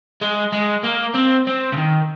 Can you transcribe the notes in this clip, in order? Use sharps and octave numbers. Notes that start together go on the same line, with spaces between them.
G#3
G#3
A#3
C4
C4
C#3
D#3